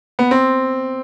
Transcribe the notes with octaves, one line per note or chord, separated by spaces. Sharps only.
B3
C4